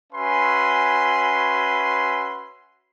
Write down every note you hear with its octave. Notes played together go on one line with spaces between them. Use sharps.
C#4 F#4 B4 E5 G#5 C6